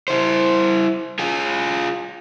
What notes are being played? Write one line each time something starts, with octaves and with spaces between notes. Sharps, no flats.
E4 C5
F4 G#4